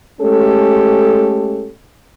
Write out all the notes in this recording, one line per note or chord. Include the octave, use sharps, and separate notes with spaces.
G#3 A3 C#4 G4 A4